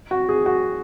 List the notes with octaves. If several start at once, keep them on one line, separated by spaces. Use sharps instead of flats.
F#4
G#4
F#4